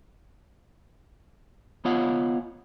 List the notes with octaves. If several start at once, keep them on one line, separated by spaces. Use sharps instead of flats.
B3 F4 C#5 D#5 F5 F#5